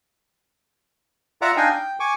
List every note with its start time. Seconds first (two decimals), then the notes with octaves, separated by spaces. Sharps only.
1.42 F4 D5 E5 F#5 A#5 D6
1.57 D4 D#4 D#5 F5 G5 G#5
1.72 G5
2.00 G#5 C#6 D6